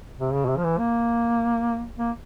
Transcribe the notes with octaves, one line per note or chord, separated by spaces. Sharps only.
C3
C#3
B2
C3
F3
E3
A#3
A#3